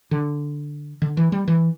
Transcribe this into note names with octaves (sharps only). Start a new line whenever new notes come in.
D3
D3
E3
G3
E3